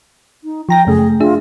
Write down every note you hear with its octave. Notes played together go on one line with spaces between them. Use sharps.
D#4
F3 G5 A#5 A#6
F#2 C#3 A3 G#4
D4 F4 G#4 E5